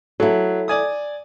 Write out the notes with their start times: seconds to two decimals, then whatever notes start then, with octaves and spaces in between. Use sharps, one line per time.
0.20 F#3 E4 A4
0.68 D5 G#5 D#6